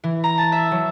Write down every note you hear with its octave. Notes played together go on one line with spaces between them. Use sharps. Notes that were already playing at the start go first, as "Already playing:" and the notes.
E3
A#5
A5
E5
F#3